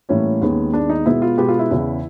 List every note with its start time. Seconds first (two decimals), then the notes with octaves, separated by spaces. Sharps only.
0.09 A2 E3 G3 A#3 C#4
0.41 D#2 D#3 G#3 B3
0.73 D#2 D#3 G#3 B3 D4
0.90 D#4
1.05 B2 G#3 B3 E4
1.22 F4
1.38 B2 G#3 B3 G4
1.49 F4
1.59 E4
1.70 E2 C#3 E3